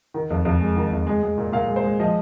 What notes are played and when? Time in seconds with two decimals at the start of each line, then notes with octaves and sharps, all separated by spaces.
0.14 D#3
0.30 F2
0.45 F2
0.61 G#3
0.77 D#3
0.92 F2
1.07 G#3
1.23 G#3
1.38 A#2
1.53 A#2 F5
1.68 G#3
1.76 C5
1.84 G#3
1.99 F3 D#5